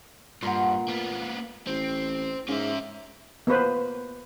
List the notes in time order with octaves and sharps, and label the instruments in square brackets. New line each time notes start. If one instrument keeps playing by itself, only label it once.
[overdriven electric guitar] G2 [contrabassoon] A#2 [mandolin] F#5 A#5 C6
[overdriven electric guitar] A#3 B3
[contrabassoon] A1 [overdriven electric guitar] C4
[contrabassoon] G#2 [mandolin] A#3 [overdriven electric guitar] C#4 E5
[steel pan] A#3 B3 B4 C5